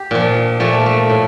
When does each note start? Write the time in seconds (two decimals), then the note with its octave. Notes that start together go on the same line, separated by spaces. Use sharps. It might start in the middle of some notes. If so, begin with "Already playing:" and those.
Already playing: G4
0.11 A#2 F3
0.60 A#2 F3 A3
0.73 A#3
0.86 A3
1.10 A2